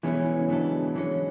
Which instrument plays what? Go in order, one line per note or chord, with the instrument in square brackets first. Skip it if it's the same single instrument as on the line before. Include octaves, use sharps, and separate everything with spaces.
[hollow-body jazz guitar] E2 B2 G#3 C#4 E4 [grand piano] E3
[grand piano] C#3
[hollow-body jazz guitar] G#2 F#3 B3 E4 A4 [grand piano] D3
[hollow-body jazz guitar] G#2 E3 G#3 C#4